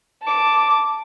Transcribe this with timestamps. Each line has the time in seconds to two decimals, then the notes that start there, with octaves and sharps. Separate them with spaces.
0.22 A5 D6